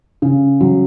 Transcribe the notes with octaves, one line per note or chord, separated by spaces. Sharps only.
C#3
F#3